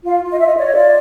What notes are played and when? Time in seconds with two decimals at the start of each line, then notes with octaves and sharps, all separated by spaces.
0.05 F4 F5
0.23 F4
0.31 D#5
0.39 F4 E5
0.46 D#5
0.58 C#5 D5
0.66 D#5
0.73 F4 D5